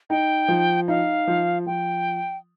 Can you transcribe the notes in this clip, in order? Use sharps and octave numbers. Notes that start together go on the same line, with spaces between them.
D#4 G5
F3
D#4 F5
F3
F3 G5